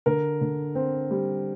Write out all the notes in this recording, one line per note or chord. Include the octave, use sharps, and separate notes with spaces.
D3 A#4
D3
C4
G3